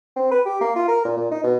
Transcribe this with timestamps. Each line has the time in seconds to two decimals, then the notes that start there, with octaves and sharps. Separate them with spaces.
0.16 C4
0.31 B4
0.46 G4
0.61 A#3
0.76 F4
0.88 A#4
1.05 A#2
1.17 A#2
1.31 D#4
1.43 B2